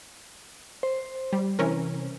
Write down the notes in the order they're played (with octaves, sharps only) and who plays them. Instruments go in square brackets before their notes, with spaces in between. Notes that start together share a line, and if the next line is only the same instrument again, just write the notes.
[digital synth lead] C5
[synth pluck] G3
[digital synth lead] C3 [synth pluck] E3 C#4 A#4